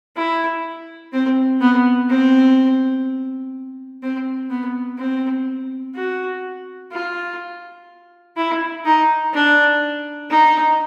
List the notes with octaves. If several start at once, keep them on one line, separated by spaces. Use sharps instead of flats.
E4
C4
B3
C4
C4
B3
C4
F#4
F4
E4
D#4
D4
D#4